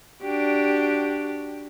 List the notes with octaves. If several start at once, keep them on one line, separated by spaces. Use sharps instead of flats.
D4 F#4 G4